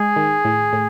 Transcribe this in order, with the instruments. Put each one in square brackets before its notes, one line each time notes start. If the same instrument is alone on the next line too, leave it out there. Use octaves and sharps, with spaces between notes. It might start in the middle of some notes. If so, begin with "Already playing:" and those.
Already playing: [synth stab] G#3 [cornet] G#4
[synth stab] D#3
A2
A2